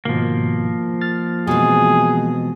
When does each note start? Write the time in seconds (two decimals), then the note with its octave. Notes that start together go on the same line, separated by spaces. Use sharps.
0.05 G#2 B2 D#3 F3 A#3
1.01 F6 A6
1.47 B2 E3 G#3 C4 F#4 G#4